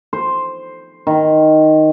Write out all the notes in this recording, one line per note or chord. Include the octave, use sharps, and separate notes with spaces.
C5
D#3